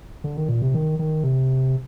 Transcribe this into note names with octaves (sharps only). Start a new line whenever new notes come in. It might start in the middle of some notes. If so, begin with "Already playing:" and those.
D3
D#3
A#2
C3
D#3
D#3
C3